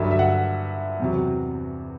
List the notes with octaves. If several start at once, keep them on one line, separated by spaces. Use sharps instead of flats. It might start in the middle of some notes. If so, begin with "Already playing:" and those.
Already playing: G2 D3 F#3 E5
E5
F#5
E2 C3 F#3